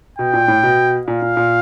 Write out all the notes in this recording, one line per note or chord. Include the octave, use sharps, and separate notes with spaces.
B2 G5
A#2
A2
B2
A#2 F5
A#2
A#2